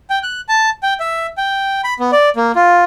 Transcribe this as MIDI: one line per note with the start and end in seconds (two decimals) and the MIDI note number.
0.10 0.19 79
0.23 0.41 90
0.49 0.70 81
0.83 0.94 79
1.00 1.27 76
1.37 1.81 79
1.84 1.94 83
1.99 2.11 59
2.12 2.29 74
2.36 2.52 58
2.55 2.84 65